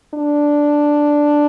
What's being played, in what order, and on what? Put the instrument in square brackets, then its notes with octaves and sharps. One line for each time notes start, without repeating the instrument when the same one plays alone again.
[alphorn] D4